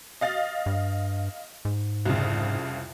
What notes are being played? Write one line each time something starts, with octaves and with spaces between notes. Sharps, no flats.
D#5 F5 A6
G2
G#2
C2 F2 C#3